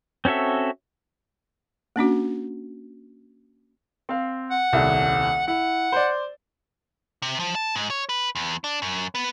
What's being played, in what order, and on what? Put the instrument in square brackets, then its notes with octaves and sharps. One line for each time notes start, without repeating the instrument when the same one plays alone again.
[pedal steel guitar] C4 C#4 F#4 A4 E5
[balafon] A#3 C#4 D4 F#4
[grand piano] C4 F5
[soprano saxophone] F#5
[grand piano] D#1 C2
[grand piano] E4 [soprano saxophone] F#5
[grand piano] C5 D5
[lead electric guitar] C3
F3
A5
G#2
C#5
B4
E2
D4
F#2
B3